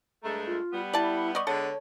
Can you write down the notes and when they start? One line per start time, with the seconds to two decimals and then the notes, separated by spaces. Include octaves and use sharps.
0.23 G2 G#3 A3 A#5
0.47 F4
0.72 G3 B3
0.93 E4 D5 A5
1.35 D5 D#5 C#6
1.47 D3 G#3 B3 A4 C#5